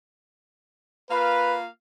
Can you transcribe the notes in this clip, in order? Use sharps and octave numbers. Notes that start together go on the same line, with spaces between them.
A#3 F4 B4 F5